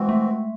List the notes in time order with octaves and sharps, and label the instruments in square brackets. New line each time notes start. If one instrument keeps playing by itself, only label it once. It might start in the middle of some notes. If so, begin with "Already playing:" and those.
Already playing: [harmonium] E3 C4 F#4 [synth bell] G#3
[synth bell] A3